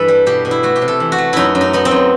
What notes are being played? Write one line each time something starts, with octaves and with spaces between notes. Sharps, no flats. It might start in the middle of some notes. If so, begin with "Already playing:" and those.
Already playing: G2 E3 A4 B4
G3
B2 G4
B2
E4
A3 F#4
G4
C3
A4
E3
F#4
A3
F#2 D#4 E4
F#2
D#4
B3 D#4
C4
F#2